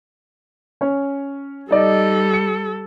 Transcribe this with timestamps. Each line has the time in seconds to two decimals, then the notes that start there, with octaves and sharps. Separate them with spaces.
0.81 C#4 C#5
1.71 G3 D#4 A4 D5 D#5
2.34 C#7